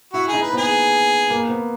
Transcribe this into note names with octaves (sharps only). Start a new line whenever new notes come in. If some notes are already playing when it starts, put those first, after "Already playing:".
E4 F#4
D#4 G#4
B4
B3 G#4
A#3
B3